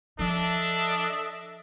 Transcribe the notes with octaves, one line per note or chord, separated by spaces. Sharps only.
F3 D4 A4 D#5 E5